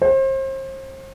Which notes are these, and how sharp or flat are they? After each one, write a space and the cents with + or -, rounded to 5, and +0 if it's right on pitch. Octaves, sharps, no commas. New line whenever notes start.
C5 +35